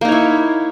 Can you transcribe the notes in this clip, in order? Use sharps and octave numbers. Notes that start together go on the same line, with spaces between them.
A#3 D#4 E4 C#5